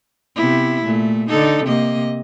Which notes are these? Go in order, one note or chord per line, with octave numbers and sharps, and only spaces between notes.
C3 B3 E4
A#2 A3
D3 D#4 A4
C3 A#3 D#5